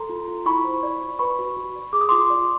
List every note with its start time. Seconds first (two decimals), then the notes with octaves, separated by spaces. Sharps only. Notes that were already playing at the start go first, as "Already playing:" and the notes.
Already playing: A4 A#5 C6
0.09 F4
0.28 F4
0.46 E4 B5 C#6
0.64 C5
0.83 D5
1.02 F4
1.19 B4 B5 C#6
1.39 F#4
1.57 F#4
1.75 D5
1.93 G#4 D6
2.01 D#6
2.09 F4 C6 D6
2.30 D5